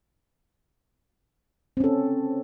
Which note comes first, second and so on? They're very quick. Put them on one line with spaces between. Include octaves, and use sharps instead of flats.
C4 C#4 A4